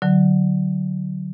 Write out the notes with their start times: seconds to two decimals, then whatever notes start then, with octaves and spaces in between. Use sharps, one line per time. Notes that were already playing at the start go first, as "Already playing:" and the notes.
0.02 D3 F#3